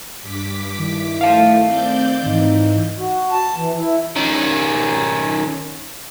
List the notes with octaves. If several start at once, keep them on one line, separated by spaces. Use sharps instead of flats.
G2 D6 B6
D#3 E4
A3 F5 A5
C4 D5 G6
G#2 E3 D#4
F#4
A5
E3
E4
D#3 C#4